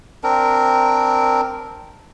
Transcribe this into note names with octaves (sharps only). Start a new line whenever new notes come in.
C4 D4 A#4